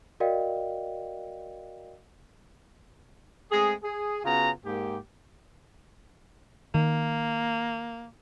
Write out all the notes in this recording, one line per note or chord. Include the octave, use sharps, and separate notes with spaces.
F#4 A#4 D5 D#5 F5 G5
G#3 A3 C4 G#4
G#4
C#3 B3 C#4 F4 F#4 A#5
G#2 A#3 G4
D#3 A#3